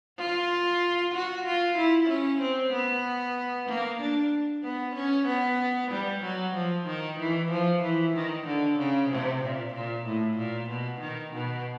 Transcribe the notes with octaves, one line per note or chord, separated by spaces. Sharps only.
F4
F#4
F4
E4
C#4
C4
B3
A#3
D4
B3
C#4
B3
G3
F#3
F3
D#3
E3
F3
E3
D#3
D3
C#3
C3
A#2
A#2
A2
A#2
B2
D#3
B2